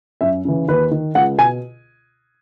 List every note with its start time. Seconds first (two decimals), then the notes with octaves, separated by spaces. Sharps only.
0.21 F#2 E5
0.45 C#3 E3
0.68 D#2 B4
0.91 D#3
1.15 C#2 F#5
1.38 B2 G#5